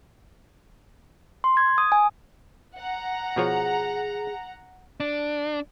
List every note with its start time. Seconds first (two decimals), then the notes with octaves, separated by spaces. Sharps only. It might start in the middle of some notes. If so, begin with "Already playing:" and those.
1.44 C6
1.57 G#6
1.78 D#6
1.92 G#5
2.77 F#5 A#5
3.36 B2 F3 G#4 C#5
5.00 D4